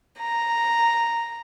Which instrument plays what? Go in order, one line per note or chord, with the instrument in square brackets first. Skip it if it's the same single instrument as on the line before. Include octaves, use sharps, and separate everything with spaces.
[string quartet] A#5